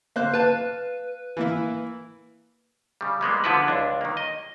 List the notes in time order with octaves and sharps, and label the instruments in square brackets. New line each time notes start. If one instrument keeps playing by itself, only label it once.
[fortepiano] A#3 C5 F#6
[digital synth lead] B4 [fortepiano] F5 A5
[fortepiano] E3 A#3 E4
[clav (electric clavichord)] C#3 G3
G3 G#3 A#3 B3
D3 F3 B3 E4 F#4 B4
C#2 D4
D#3 A#3
D#5